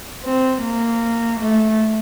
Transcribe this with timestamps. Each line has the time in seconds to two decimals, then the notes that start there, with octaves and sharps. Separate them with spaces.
0.24 C4
0.62 A#3
1.39 A3